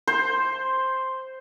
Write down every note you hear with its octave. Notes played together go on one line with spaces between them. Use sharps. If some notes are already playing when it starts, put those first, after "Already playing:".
C5